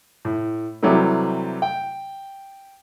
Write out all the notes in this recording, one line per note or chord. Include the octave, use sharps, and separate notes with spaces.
A2
C3 E3 F#3 G3 A3
G5